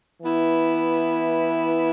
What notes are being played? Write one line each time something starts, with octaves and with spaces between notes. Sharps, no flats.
E3 B3 E4